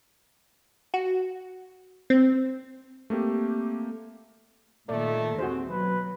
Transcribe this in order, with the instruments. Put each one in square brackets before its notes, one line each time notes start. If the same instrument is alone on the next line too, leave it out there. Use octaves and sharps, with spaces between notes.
[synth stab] F#4
C4
[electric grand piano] A3 A#3 C4 G4
[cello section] A#2 D#3 [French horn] A3 [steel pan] D5
[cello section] D#2 C4 [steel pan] F#4 G#4 C5
[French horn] B2 [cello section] F#3 [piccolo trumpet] B4